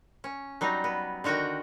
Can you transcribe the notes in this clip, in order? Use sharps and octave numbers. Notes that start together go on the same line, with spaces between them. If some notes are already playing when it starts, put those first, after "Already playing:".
C#4
F#3 G3 D#4
B3
D3 D#3 F#4 D#5 G5